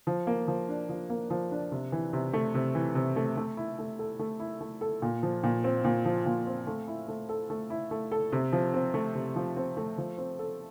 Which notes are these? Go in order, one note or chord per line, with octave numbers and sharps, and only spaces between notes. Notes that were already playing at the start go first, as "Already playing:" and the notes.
F3
A#3
F3
D4
F3
A#3
F3
D4
C3
E3
C3
A3
C3
E3
C3
A3
A3
E4
A3
A4
A3
E4
A3
A4
A#2
F3
A#2
C4
A#2
F3
A#2
C4
A3
E4
A3
A4
A3
E4
A3
A4
C3
F3
C4
A3
C3
F3
C4
A3
F3
C4
A4